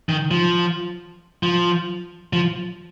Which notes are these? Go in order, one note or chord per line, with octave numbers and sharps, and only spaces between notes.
D#3
F3
F3
F3